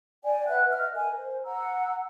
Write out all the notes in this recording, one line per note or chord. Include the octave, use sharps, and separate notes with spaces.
D5 G5 G#5
B4 E5 F#5 F#6
D#5 E5 F6
A#4 G#5
C5
F#5 A#5 E6